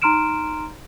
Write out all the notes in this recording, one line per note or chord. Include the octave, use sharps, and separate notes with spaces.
D#4 A#5 C6 F6 D7 E7